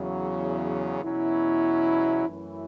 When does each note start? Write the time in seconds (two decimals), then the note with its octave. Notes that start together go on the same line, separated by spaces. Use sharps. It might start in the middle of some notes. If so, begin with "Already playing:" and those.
Already playing: E2 C#3 F#3
1.04 E2 B2 F#3 C#4 E4
2.28 F#2 E3 A3 E4